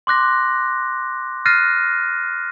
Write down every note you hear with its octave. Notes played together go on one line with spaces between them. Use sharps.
C6 D6 F#6 A#6
F6 F#6 A6 A#6 C7 D#7